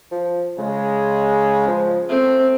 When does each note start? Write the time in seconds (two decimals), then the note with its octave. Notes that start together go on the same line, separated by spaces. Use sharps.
0.11 F3
0.58 C#3 G#3
1.68 F3
2.09 A3 C4